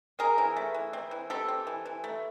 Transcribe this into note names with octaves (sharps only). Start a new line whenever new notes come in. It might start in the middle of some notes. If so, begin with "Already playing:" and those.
C4 G#4 A#4
E3
A3
E3
C4
E3
C4 G4 A4
C4
E3
E3
A3